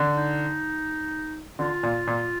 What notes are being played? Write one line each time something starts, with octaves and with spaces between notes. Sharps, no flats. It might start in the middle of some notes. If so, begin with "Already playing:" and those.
Already playing: D3
D#4
D3 F4
A#2
A#2